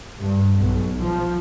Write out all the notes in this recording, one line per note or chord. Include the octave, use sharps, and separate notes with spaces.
G2
B1
F3